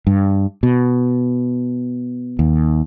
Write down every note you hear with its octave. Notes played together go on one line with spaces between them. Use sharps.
G2
B2
D#2